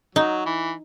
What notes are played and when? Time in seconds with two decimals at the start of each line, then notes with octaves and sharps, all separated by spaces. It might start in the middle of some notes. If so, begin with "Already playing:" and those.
0.15 F#3 D#4
0.46 E3